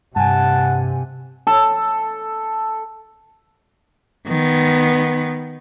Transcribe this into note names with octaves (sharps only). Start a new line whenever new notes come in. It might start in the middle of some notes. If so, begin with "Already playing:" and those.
G2 C3 F#5 G#5 A5
A4
D#3 B3